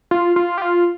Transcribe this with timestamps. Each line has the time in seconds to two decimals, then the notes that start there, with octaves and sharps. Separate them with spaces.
0.11 F4
0.36 F4
0.58 G4
0.62 F4